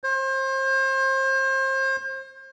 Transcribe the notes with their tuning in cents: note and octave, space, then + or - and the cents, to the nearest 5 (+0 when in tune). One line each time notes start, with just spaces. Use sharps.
C5 +35